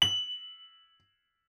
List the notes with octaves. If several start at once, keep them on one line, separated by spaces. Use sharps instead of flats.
F#7